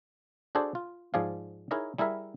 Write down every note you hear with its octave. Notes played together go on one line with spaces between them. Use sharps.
D4 F#4 G#4 A4 C5 D5
F4
G#2 F3 G#4 D5 F5
D#4 E4 G#4 A#4 C#5 D#5
G3 E4 G#4 A#4 E5